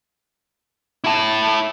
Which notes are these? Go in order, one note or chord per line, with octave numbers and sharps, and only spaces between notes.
E4 A5